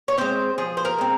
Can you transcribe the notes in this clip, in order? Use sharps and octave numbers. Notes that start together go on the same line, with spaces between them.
C#5
G#3 C4 C5
F3 G#4
C5
A#4
G#3 C4